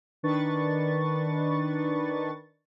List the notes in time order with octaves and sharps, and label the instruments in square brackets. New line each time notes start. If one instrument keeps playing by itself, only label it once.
[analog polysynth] D#3 D4 B4 C#6 A6